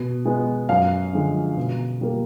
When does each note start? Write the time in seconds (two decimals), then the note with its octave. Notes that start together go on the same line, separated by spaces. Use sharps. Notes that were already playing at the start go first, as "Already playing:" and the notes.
Already playing: B2
0.25 G#3 B3
0.69 F#2 F5
1.13 D3 F3 G#3
1.57 B2
2.01 G3 A#3